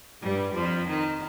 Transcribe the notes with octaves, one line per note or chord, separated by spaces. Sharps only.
G2 G3
F2 F3
D#3